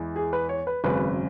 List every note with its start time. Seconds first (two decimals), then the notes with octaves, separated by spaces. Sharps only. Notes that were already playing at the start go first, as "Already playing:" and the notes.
Already playing: E2 E3 G#3
0.16 G#4
0.33 B4
0.49 C#5
0.67 B4
0.84 G#1 F#2 C#3 B4